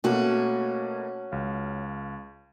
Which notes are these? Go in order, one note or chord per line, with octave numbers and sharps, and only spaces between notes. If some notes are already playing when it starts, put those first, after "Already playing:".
B2 A3 A#3 C#4 F#4
C#2 F5